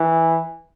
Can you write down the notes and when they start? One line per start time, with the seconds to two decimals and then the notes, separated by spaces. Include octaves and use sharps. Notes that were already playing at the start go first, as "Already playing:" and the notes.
Already playing: E3